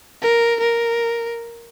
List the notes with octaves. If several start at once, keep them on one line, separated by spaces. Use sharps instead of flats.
A#4
A#4